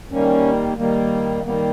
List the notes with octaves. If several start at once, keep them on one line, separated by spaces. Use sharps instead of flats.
D#3 G3 A#3 C#4
D#3 G3 A#3
D#3 G3 A#3 B3